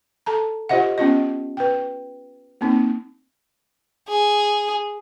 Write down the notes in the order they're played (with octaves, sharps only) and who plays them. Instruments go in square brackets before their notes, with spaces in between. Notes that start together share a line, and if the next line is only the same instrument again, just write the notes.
[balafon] A4 A5 A#5
F4 G4 C5 D#5 E5 F#5
B3 C#4 F4 D#5
B4 G5
A#3 C4 D#4
[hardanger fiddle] G#4